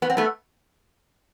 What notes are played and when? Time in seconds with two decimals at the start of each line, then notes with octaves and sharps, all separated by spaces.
0.02 B3
0.10 C4
0.17 A3 B3